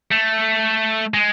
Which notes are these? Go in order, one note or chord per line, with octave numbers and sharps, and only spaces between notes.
A3
G#3